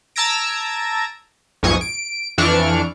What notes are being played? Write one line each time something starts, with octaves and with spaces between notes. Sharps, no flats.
A5 A#5 E6 G#6 A#6 D7
B1 F2 G#2 G#5 C#6 D#6
D7
F2 E3 D4 C#6 F6 D7